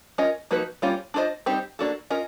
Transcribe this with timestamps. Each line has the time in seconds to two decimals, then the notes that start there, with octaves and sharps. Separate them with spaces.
0.18 C#4 F4 A#4 D#5
0.51 F3 A#3 D#4 F#4 B4
0.82 G3 A#3 C#4 F4
1.14 D4 F4 A4 C5 D#5
1.46 G3 C4 D#4 G4 C5
1.79 A#3 D4 F#4 A4
2.10 C#4 F4 A#4 D#5